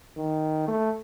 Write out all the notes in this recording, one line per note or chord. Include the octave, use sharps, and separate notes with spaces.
D#3
A3